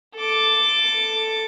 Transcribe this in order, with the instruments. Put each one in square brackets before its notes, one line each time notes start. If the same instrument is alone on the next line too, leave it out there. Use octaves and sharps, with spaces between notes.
[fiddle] A4 D6